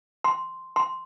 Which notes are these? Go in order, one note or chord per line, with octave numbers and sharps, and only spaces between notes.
C6
C6